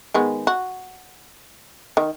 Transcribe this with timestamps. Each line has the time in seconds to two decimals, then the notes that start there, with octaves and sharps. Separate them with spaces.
0.14 D#3 G#3 B3
0.47 F#4
1.97 D#3